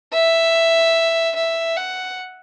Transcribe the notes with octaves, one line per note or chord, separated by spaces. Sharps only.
E5
E5
F#5